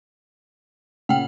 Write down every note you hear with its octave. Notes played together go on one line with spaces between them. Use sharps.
A#2 C#3 F#5 G5